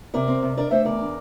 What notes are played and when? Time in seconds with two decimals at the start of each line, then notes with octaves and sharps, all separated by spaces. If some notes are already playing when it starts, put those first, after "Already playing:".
0.14 C3 A#4 D5
0.28 C4
0.43 C3
0.57 D4 A#4 D5
0.71 A3 C5 E5
0.85 E2 A#4 D5
1.00 D4